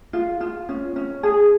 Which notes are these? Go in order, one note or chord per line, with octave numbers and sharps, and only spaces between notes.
F4
F4
C#4
C#4
G#4